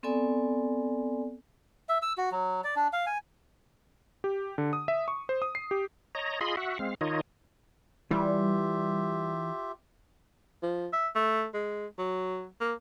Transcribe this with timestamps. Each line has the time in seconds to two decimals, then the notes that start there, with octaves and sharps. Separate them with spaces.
0.03 B3 C4 A4 D5 G#5
1.89 E5
2.02 E6
2.18 F#4
2.32 F#3
2.64 D5
2.76 D4
2.93 F5
3.06 G#5
4.24 G4
4.58 D3
4.73 D#6
4.88 E5
5.08 C#6
5.29 C5
5.42 D#6
5.55 C7
5.71 G4
6.15 C#5 D#5 A#5
6.41 F4 G#4 D#5 B5 C6
6.57 F#4 E5 F#5
6.79 G#3 C4 F5
7.01 D#3 D#4 F4 C#5 D#5
8.11 E3 G3 F4 G4 E5
10.63 F3
10.93 E5
11.15 A3
11.54 G#3
11.98 F#3
12.61 A#3